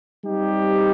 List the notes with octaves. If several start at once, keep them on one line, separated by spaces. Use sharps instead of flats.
G3 C4 D#4 G4